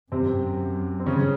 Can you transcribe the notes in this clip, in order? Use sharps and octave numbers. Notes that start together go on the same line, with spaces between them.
F#2 C3 C4
C4
G2 C#3 C#4